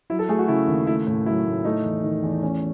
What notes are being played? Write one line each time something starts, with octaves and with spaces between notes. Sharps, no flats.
F#3 E4
A4
A3 G#4
F#4
C#3 E4
D#2
A3 E4
A2
F#3 E4
A2
A3 D#4
E2
D#3
E2
A3 C#4